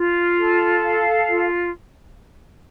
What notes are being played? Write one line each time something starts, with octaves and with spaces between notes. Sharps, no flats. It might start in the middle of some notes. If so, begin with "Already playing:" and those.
Already playing: F4
A4
F5
F4